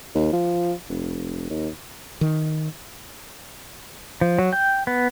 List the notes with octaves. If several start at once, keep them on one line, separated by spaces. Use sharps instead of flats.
D#2
F3
F1
D#2
D#3
F3
F#3
G5
B3